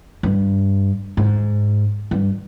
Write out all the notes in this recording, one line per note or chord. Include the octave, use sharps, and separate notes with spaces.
G2
G#2
G2